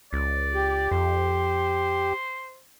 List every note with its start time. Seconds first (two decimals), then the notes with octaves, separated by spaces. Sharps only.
0.13 C#2 D5
0.54 G4
0.91 F2 C5